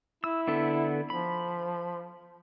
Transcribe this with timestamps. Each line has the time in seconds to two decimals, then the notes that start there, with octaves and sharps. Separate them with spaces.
0.24 E4 E6
0.48 D3 B3 A4
1.10 F3 B5